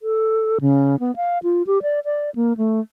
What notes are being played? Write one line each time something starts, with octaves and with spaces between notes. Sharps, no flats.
A4
C#3
B3
F5
F4
G4
D5
D5
A#3
A3